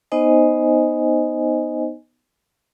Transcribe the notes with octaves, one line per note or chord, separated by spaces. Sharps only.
B3 D#4 C5 D#5 G#5